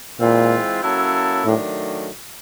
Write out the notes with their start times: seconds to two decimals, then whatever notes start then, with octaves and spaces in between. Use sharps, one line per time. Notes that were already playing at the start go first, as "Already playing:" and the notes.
0.19 A#2 E3 G#3 C4 F4
0.82 F#3 A#3 C#4 E4 A4
1.45 A2 D#3 F#3 A3 D4